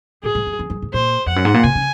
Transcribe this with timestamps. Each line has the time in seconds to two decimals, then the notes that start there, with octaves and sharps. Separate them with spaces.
0.23 A#2 G#4
0.35 G#2
0.47 F#2
0.59 F2
0.70 F#2
0.82 G#2
0.93 A#2 C5
1.26 F2 F#5
1.36 F#2
1.45 G#2
1.54 A#2
1.64 C3 G#5
1.75 C#3